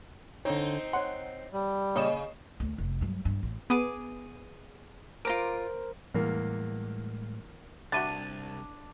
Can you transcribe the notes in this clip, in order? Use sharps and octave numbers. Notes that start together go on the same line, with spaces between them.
D3 C4 D#4 C#5
C#5 F#5 C6
G3
A#2 C#3 C#5 D#5 E7
D2
F1
G2 F#3
G2
A1
B3 G#4 D6 D#7
F4 A#4 C5 A#5 D6 D7
E2 A2 G3 G#3 A#3
C2 D4 F#4 E5 B5 A6 D#7